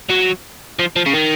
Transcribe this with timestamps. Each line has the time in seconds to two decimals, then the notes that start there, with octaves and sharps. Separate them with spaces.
0.10 F#3
0.79 F3
0.96 F3
1.06 C#3
1.14 D#3